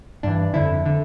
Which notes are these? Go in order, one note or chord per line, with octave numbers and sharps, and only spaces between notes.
G2 E3 D4
F2 D3 E4
D3